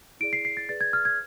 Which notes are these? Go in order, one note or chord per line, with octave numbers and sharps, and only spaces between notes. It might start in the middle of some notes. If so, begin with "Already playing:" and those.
E4 G#4 D5 D7
C7
C7
A6
G#4 B4 D5 A6
G#6
F6
G#6